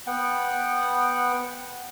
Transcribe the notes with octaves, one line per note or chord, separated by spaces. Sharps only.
B3 F#5 G5